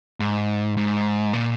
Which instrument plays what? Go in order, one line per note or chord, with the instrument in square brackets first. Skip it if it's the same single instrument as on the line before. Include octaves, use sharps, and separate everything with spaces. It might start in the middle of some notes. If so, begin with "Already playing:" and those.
[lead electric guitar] G#2
G#2
A#2